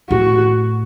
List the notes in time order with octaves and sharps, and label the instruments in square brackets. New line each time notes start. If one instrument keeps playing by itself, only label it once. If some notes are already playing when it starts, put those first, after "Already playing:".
[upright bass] A2 [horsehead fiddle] F#4